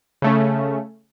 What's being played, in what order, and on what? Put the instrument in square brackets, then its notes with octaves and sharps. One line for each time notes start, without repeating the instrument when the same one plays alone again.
[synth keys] C#3 A3 C#4